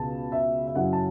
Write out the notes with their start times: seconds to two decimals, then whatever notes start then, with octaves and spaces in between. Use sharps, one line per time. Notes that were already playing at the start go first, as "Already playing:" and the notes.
Already playing: C#2 B2 A5
0.32 E5
0.67 E5
0.75 F#2 C#3 F#3 C#4 E4 F#5
0.93 A5